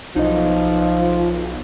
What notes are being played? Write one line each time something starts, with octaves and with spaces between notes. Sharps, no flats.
B1 F3 D#4 D#5